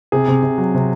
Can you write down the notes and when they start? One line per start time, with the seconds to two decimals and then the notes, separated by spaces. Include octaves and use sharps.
0.12 C3 G#4
0.28 C3
0.43 C3
0.58 F#3
0.74 C3